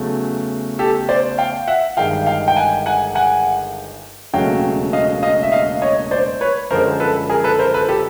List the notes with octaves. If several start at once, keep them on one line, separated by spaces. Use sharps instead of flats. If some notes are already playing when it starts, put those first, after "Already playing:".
Already playing: E2 C#3 F#3 A3
G4 A4
C5 D5
F5 G5
E5 F#5
G1 G2 D#3 G#3 F5 G5
F5 G5
G5
F#5 G#5
F#5 G#5
F#5 G#5
E1 D#2 C#3 F#3 A3 F5 G5
D#5 F5
D#5 F5
E5
D#5 F5
C#5 D#5
C5 D5
B4 C#5
F#2 D3 F3 G#3 A#4 C5
A4 B4
G#4 A#4
A4 B4
A#4 C5
A4 B4
G4 A4